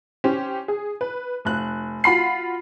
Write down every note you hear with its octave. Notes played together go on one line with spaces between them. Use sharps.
C#4 G4 C5
G#4
B4
F1 F#6
F4 F#4 B5 C7